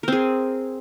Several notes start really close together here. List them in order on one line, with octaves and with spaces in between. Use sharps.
A#4 C4 G#4